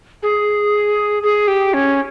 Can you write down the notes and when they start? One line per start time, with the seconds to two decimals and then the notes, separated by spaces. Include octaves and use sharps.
0.23 G#4
1.23 G#4
1.48 G4
1.74 C#4